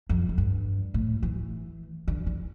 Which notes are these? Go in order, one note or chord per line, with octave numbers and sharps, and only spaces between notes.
F2
F2
G2
A2
E3
D3
E3